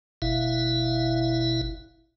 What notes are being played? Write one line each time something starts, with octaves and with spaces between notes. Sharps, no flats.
G1 B2 E4 E5 F5